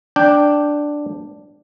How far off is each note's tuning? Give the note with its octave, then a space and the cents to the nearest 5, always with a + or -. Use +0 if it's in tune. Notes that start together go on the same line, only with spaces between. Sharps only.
D4 +0 G5 +0